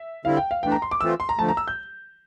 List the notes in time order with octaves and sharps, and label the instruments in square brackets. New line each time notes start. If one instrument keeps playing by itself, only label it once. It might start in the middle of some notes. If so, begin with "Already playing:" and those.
Already playing: [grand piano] E5
[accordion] D3 G3 C4 E4 [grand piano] F5
[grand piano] G5
F5
[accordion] E3 A3 D4 [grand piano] G5
[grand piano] A#5
C6
D6
[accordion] E3 A3 C4 F4 [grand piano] E6
[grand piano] C6
A#5
[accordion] D3 F3 A3 [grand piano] A5
[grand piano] A#5
E6
G6